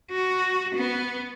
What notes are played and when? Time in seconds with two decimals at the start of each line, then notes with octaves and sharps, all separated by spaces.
0.11 F#4
0.75 B3